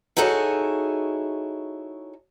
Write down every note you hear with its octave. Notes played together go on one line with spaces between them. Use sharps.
D#4 E4 F#4 G#4 A4 C#5